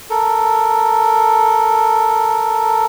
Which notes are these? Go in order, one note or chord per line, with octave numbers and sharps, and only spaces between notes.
A4 A#4